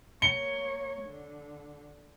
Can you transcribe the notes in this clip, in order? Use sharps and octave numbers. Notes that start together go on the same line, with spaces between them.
A#3 C#5 C#7 G7
D3